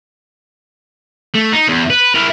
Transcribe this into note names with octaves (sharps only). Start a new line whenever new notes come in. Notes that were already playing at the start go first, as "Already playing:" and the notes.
A3
D#4
E2
B4
E4 A#4